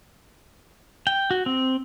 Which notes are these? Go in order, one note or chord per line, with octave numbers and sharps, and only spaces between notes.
G5
F#4
C4